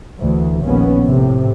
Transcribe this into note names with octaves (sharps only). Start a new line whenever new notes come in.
D2 E3
A#1 D#2 B3 C#4
A2 C3